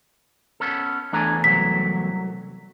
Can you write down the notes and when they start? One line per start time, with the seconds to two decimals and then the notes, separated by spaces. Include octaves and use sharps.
0.60 B3 C#4 A4
1.13 E2 A3 D4 G#5 A#5
1.44 C2 F#3 B6